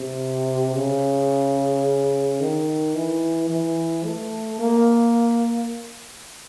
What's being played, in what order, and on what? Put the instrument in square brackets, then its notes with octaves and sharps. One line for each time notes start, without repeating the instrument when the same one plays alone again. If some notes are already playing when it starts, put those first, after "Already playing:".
Already playing: [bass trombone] C3
C#3
D#3
E3
E3
A3
A#3